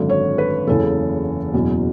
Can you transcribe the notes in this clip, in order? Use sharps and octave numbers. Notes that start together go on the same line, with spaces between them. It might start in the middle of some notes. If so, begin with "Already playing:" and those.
Already playing: G#1 F#2 D3
C#5
B4
F#1 E2 C#3 E3 A4
F#1 E2 B2 F#3